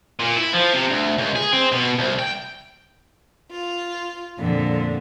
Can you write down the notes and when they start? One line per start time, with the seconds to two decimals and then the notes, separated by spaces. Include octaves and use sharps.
0.20 A#2
0.37 E4
0.54 F3
0.73 C3
0.91 D2
1.18 C#2
1.36 G#4
1.52 C4
1.72 B2
1.99 C2
2.19 G5
3.52 F4
4.38 F2 A#2 D3